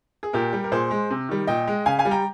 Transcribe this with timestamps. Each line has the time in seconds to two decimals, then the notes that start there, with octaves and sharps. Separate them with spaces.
0.23 G#4
0.33 A#2 G4 A#4
0.53 G3
0.64 A#4
0.72 A#2 G#4 C5
0.91 G#3
1.10 C3
1.29 D#3 G3
1.47 A#2 D#5 G5
1.67 G#3
1.86 C#3 F5 G#5
1.98 F5 G#5
2.05 G3
2.11 G5 A#5